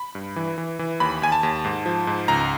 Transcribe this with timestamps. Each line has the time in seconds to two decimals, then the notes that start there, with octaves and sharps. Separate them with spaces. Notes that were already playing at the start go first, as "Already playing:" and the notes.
Already playing: B5
0.15 G2
0.36 E3
0.58 E3
0.79 E3
1.00 D#2 B5
1.22 D#2 G#5
1.32 A5
1.43 D#2
1.65 G#2
1.86 F3
2.07 G#2
2.28 C#2 A#5